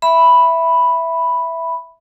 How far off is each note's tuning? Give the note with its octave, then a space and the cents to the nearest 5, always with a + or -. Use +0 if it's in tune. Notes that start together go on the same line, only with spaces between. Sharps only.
E5 +0 B5 +0